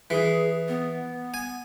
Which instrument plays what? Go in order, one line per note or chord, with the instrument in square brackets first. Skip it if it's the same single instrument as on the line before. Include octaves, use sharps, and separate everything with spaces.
[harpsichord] E3 [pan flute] G#4
[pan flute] B3
[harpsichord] G#5